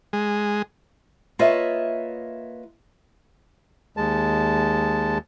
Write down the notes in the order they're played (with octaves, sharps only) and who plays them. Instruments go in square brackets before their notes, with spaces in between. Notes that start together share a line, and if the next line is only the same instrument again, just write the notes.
[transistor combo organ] G#3
[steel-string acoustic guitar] A#3 F4 B4 C#5 D#5 E5
[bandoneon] D#2 G#3 A5